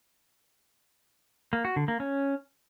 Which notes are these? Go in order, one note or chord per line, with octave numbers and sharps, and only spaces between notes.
A#3
F#4
D3
A#3
C#4